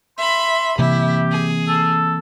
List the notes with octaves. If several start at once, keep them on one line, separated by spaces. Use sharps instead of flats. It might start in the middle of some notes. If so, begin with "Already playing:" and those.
E5 B5 C6
C3 E3 A#3 E4 G4
G#4
A4